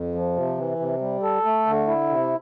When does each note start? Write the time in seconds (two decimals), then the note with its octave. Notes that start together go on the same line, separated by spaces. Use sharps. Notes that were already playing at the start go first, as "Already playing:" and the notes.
Already playing: F2
0.15 F3
0.36 C3
0.58 E3
0.79 C3
1.01 G3
1.23 A4
1.45 A3
1.66 D3
1.87 E4
2.09 C3